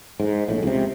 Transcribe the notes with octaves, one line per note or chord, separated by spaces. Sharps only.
G#2
A#1 A2
C#2 C3